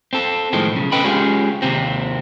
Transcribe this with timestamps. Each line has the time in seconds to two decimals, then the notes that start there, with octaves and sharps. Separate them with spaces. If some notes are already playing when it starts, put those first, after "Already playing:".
0.13 C4 A4
0.53 A2 D#3 F3 G#3 C4
0.72 B1 C#3
0.92 C#4 A4 B4 D#5 G5 B5
1.04 G#3 C#4 F4 G4 G#4
1.62 D#2 C3 C4